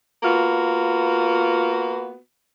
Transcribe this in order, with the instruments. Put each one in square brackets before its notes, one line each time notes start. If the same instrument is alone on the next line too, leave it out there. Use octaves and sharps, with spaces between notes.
[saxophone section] A#3 B3 F4 F#4